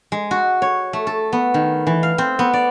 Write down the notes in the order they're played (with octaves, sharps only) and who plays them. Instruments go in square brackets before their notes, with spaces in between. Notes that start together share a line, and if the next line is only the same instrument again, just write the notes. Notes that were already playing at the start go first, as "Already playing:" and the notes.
[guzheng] G#3
F#4
C#5
A3
A4
B3
D#3
E3
F5
C4
B3
D5